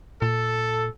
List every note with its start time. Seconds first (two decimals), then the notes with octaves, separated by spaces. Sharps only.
0.22 A#2 A4